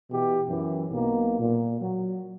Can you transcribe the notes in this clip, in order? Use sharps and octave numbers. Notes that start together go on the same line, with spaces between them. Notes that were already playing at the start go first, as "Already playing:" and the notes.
B2 E3 G4
F#2 E3
B1 B2 A#3
A#2
F#3